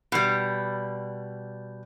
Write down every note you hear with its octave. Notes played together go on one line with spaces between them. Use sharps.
B2 G3